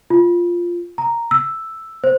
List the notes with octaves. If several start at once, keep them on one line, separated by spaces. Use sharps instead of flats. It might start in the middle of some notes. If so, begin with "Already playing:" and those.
F4
A#5
E6
C5